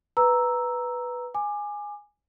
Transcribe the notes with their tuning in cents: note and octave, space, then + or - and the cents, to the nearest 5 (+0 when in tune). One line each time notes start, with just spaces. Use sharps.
B4 +0 A#5 +0 E6 -5
G#5 -5 D6 +25